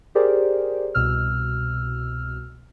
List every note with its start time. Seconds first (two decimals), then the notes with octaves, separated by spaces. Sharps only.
0.15 G4 G#4 A#4 C5 D5
0.95 C2 B2 E6 F6